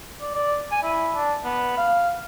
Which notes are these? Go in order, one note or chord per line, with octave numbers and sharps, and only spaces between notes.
D5
D5
G#5
E4
D4
B3
F5